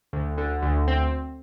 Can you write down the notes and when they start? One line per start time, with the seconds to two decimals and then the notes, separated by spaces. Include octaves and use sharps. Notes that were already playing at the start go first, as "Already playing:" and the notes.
0.13 D2
0.38 D3
0.62 D2
0.88 C4